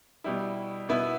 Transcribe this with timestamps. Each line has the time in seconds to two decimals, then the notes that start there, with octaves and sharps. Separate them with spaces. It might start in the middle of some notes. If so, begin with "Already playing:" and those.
0.24 B2 G3 E4
0.89 B2 B3 E4